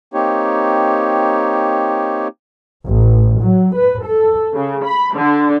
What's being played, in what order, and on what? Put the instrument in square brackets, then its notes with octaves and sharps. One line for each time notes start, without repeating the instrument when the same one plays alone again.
[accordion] A#3 C4 D#4 G4 C#5
[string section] A1
F#3
B4
A4
C#3
B5
D3